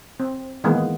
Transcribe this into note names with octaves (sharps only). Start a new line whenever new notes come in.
C4
D#3 E3 G#3 A#3 B3